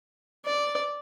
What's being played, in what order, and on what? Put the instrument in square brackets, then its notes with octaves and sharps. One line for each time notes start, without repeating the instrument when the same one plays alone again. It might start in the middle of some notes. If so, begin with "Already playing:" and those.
[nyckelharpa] D5